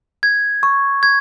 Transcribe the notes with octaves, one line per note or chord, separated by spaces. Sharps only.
G#6
C#6
G#6